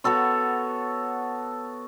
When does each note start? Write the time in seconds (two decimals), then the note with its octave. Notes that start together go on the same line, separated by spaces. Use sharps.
0.04 B3 F#4 A4 C#5